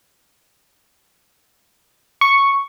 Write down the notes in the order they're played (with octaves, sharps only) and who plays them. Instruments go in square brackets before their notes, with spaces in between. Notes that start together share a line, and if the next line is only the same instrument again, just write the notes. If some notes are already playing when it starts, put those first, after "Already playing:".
[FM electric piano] C#6